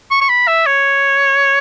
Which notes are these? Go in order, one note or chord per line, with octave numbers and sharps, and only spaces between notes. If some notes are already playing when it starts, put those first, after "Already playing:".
C#6
C#6
B5
E5
C#5